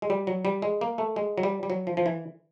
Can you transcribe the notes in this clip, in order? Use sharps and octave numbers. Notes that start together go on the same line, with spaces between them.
G#3
G3
F#3
G3
G#3
A#3
A3
G#3
F#3
G3
G3
F#3
F3
F3
E3